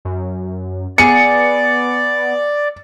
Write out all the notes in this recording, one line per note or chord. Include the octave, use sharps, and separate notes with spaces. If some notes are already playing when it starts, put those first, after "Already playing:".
F#2
B3 G#4 D5 C#7